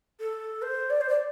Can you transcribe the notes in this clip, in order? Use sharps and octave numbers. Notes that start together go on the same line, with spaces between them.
A4
C5
D5
C5
D5